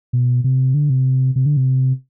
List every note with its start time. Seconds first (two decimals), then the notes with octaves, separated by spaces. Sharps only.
0.13 B2
0.44 C3
0.74 D3
0.90 C3
1.36 C3
1.46 D3
1.57 C3